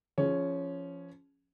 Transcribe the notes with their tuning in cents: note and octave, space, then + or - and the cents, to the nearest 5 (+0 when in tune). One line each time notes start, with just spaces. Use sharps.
F3 -20 C#4 +0 G#4 +0